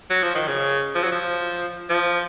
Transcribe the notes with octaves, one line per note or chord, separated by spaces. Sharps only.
F#3
F3
D#3
C#3
F3
F#3
F3
F3